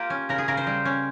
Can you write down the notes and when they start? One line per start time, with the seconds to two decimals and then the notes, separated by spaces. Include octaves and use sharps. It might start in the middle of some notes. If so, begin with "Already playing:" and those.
Already playing: A#3 F4 G4
0.10 C#4
0.29 C#3 A#4
0.38 G#4
0.48 C#3 A#4
0.57 C5
0.67 G3
0.85 C#4